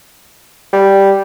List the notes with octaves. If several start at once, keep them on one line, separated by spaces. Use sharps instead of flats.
G3